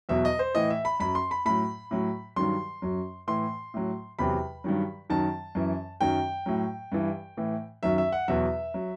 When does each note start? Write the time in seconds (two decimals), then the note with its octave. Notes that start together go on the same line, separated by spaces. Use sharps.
0.09 E2 B2 F#3 E5
0.25 D#5
0.39 C5
0.55 A2 E3 D#5
0.70 E5
0.85 B5
1.00 F#2 F#3 B5
1.15 C6
1.31 B5
1.45 A2 F#3 B5
1.91 A2 F#3
2.36 G2 D#3 F#3 C6
2.82 F#2 F#3
3.27 A2 E3 C6
3.74 A2 F#3
4.19 E2 C3 F#3 B5
4.64 G2 D#3 F#3
5.10 F#2 D#3 F#3 A5
5.55 F#2 E3
6.01 F#2 D#3 F#3 G5
6.46 A2 F#3
6.92 G2 E3
7.37 A2 E3
7.83 F#2 D#3 F#3 E5
7.98 E5
8.12 F#5
8.28 E2 B2 F#3 E5
8.74 F#3